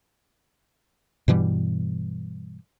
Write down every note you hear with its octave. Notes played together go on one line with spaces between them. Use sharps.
G2 B2 E3 G3